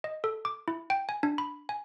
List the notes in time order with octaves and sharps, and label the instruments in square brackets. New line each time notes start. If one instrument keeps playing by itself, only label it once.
[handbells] D#5
A4
D6
E4
G5
G#5
D4
B5
G#5